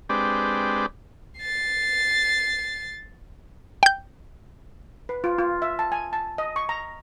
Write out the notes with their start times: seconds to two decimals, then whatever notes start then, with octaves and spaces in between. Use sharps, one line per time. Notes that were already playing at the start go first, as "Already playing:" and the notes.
0.09 G#3 C4 D4 G4 B4 D5
1.39 A6 C7
3.83 G5 G6
5.09 B4
5.24 F4
5.38 F4
5.62 E5
5.79 A5
5.92 G#5
6.13 A5
6.38 D#5
6.56 C#6
6.69 A#5